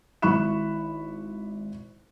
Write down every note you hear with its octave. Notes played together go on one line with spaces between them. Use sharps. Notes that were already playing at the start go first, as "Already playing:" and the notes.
G#1 E4 B5 C#6 F#6 E7